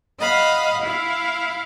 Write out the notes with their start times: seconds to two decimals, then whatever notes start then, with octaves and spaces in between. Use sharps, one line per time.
0.20 D#5 F5 F#5 B5
0.82 E4 F5